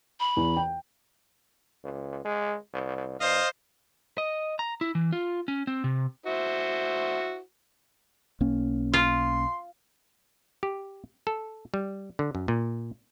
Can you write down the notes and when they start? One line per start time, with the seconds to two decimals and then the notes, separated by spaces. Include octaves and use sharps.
0.20 B5
0.37 E2
0.57 G5
1.84 C#2
2.25 G#3
2.73 C2
3.20 G2 C5 D#5 F5
4.18 D#5
4.59 A#5
4.81 E4
4.95 E3
5.12 F4
5.48 C#4
5.67 C4
5.84 C3
6.26 E4 F#4 C5
8.40 B1 A#3 C#4
8.94 F4 C6
10.63 G4
11.27 A4
11.74 G3
12.19 D3
12.35 F#2
12.48 A#2